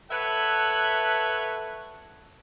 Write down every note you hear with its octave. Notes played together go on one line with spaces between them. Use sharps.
A4 B4 C#5 E5 F#5